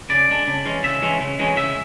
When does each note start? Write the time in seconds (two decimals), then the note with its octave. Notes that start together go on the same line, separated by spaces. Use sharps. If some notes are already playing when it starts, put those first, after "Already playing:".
0.09 C#3 D5
0.29 G#3 D4
0.47 C#3
0.65 E3 G#3 C#4
0.83 C#3 E5
1.02 E3 G#3 C#4
1.20 C#3
1.39 E3 G#3 C#4
1.56 C#3 E5